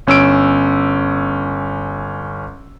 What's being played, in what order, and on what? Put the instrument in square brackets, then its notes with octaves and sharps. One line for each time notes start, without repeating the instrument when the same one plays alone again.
[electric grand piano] G1 C#4 E6 D7